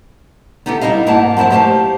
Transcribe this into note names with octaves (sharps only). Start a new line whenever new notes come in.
B3 D#4 E4 G4 A4
G3 D#4 E4 D#5 F5
G#2 A#3 B3 F#4 E5 A5
F3 F#3 E4 C5 A5
A3 G4 C5 E5 F5 A5